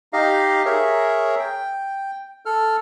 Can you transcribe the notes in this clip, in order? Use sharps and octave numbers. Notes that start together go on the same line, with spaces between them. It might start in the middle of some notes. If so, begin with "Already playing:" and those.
D#4 G4 D#5 F5
G#4 A#4 C#5 E5
G5
A4 F6